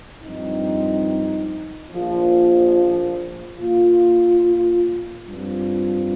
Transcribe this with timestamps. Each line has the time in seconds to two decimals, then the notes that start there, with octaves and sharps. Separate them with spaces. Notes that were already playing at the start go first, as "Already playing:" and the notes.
0.23 G2 F3 C4 D#4
1.91 A#1 A#2 F3
3.59 A#2 A#3 F4
5.28 G2 F3 C4 F4